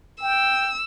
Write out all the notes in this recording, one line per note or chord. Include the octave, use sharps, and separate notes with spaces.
G5 E6